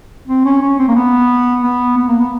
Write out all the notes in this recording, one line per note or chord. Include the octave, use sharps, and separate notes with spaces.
C4
C#4
C#4
C4
A#3
B3
B3
B3
A#3
B3